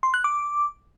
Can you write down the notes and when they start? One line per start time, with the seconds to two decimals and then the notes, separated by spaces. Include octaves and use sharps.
0.03 C6
0.14 F#6
0.24 D6